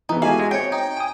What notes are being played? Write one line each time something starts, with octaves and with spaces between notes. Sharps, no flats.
E3 B3 D#4
G#3 F#4 G4 A4 E5 F5 G#5
G#3
C4 C#5 G5
D#4 G5
G#5 D#6